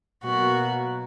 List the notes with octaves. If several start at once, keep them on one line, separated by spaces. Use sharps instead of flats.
B2 F#3 A#3 F#4